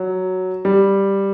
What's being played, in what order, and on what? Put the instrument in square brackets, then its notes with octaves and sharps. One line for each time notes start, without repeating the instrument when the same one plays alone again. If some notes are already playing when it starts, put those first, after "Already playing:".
Already playing: [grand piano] F#3
G3